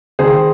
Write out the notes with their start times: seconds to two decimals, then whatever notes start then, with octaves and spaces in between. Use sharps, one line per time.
0.19 D#3 G#4 C5